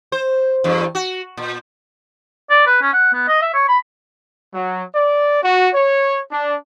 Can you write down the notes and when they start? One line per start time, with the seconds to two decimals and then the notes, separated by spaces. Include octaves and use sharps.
0.12 C5
0.64 E2 G2
0.95 F#4
1.37 A#2
2.50 D5
2.67 B4
2.82 C#4
2.93 F#5
3.13 B3
3.28 D#5
3.42 E5
3.54 C#5
3.69 B5
4.54 F#3
4.94 D5
5.42 F#4
5.72 C#5
6.30 D4